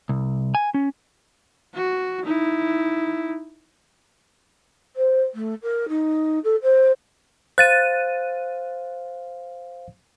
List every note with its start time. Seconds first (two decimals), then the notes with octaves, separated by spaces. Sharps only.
0.09 C2
0.55 G#5
0.74 C#4
1.74 F#4
2.23 D#4 E4
4.96 C5
5.34 A3
5.62 A#4
5.88 D#4
6.44 A4
6.62 C5
7.58 C5 F5 F#6 A6 D#7